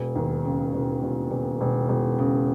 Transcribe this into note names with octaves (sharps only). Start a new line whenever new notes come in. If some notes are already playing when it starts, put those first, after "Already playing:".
Already playing: E1
D#2
C#3
E1
E1
E1
E1
E1
C#3